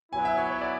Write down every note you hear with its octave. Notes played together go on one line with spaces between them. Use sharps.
F#3 B3 E4 G#5
E5
C#5
C#5
D5